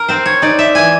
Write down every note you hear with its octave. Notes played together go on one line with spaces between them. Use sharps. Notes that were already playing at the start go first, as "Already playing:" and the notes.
Already playing: A#4
C4 C5
C#5
D#4 D5
E5
E3 G#5